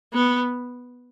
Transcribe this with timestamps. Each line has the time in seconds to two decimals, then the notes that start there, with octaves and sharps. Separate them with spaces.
0.14 B3